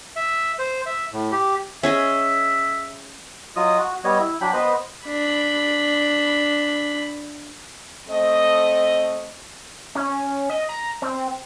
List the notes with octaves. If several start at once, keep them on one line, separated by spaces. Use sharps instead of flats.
E5
C5
E5
A2
G4
C#4 G#4 D#5 E5
F#3 F4 D#5 D#6
F#4
G3 B3 C#5 D#5
E4
F#3 D4 G5 B5
B3 B4 C5 D#5
D4 B5
A3 C4 D#5
C#4
D#5
A#5
C4